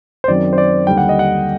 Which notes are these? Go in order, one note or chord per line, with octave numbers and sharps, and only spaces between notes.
C5
F#2 D#3 F#3 C4 D5
C5
D5
D#2 D3 G3 D4 G5
F#5
D#5
F#5